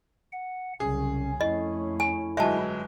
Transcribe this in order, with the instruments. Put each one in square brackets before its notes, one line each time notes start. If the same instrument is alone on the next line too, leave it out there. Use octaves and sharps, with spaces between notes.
[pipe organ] F#5
[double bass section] C2 C#3 F#3 [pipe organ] C#4 [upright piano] G#4
[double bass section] F2 A3 C#4 [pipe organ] E4 [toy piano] D#5
[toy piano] G#5
[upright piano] G1 F#3 G#3 [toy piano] E5 A5